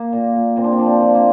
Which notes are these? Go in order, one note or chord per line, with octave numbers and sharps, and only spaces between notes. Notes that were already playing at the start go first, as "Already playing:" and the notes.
Already playing: A#3
A#2
A#2
A#2 C4
D4
C4
F3 D4
C4
F3
A#3